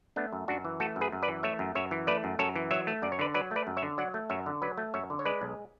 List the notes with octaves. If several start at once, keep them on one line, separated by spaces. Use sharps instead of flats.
A3 B3 D4
F#2
F#2 D4 F#4
E3
A3 F#4 A4
F#2
G#4 B4
F#2
B4 D5
E3
A3 C#5 E5
F#2
F#2 C#5 E5
E3
A3 B4 D5
F#2
F#2 A4 C#5
E3
F#3 C#5 E5
A3
F#2 D5
C#5
D3 B4 D5
F#3 B4 D5
A3 B4 D5
F#2
C#5 E5
D3
F#3 D5 F#5
A3
F#2 C#5 E5
D3
F#3 B4 D5
A3
F#2 C#5 E5
D3
C#5
G#3 B4 D5
B1